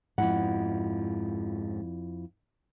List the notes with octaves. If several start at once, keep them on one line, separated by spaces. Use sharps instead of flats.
F2 G#2 F3 E4 F#5